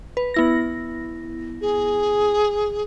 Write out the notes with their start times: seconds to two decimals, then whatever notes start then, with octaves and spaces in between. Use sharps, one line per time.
0.17 B4
0.34 B3 E4 A#6
1.61 G#4